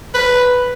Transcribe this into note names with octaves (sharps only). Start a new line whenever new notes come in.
B4